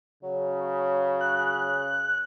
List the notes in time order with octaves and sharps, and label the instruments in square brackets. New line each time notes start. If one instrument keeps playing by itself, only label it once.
[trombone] C#3 [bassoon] F#3
[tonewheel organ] F#6